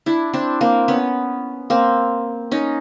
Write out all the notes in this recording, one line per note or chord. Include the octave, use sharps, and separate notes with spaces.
D4 E4
C4 D4
A#3 C4
B3 C#4
A#3 C4
C#4 D#4